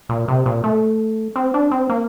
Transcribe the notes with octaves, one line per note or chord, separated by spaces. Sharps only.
A#2
C3
A#2
A3
C4
D4
C4
A#3